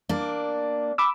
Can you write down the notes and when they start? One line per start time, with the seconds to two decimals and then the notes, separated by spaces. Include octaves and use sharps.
0.09 A#3 D4
0.98 B5 D6 E6